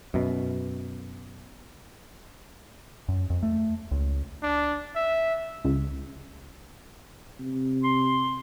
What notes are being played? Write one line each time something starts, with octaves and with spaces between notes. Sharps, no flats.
F#2 B2
F#2
F2
A3
C#2
D4
E5
C#2
C3
C6